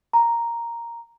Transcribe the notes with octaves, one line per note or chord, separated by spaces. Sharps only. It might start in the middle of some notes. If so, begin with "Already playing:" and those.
A#5